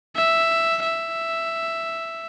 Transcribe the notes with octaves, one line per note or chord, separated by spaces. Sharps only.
E5
E5